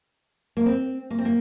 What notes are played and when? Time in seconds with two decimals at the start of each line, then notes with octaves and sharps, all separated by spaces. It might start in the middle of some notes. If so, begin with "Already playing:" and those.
0.57 A#3
0.66 C4
1.10 A#3
1.18 C4
1.25 A#3